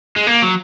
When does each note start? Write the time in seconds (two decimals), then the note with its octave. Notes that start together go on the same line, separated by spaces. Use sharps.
0.16 G#3
0.27 A#3
0.42 F#3